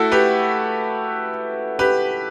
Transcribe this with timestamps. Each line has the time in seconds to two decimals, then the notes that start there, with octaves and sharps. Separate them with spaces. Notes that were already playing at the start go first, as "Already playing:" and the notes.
Already playing: A3 E4 F#4 A4
0.12 G4 B4
1.79 G4 B4